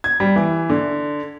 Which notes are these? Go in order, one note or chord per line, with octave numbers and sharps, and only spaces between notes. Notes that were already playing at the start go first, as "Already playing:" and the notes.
G#6
G3
E3
D3